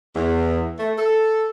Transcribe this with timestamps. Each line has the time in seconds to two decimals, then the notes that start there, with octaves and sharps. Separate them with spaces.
0.14 E2
0.77 A3
0.97 A4